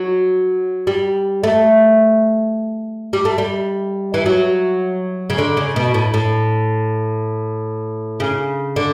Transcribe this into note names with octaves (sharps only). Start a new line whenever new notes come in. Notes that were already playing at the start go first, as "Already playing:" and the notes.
Already playing: F#3
G3
A3
G3
A3
G3
E3
F#3
C#3
D3
C#3
B2
A2
A2
C#3
D3